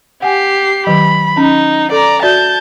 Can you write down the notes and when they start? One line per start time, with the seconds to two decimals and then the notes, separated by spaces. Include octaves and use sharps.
0.22 G4 F#5 G#5 C7
0.87 D#3 F#3 B5
1.37 C#4 D#4
1.92 A4 D5 A#5
2.22 F#4 D5 E5 A5 G6